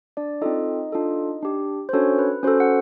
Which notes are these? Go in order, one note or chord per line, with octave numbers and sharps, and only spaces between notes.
D4 D5
C4 D#4 F4 A4 D#5
D4 F4 A4
D4 G4
C5
C#4 D4 F#4 A4 C#5
B4
C#4 F#4 A4 C5
F#5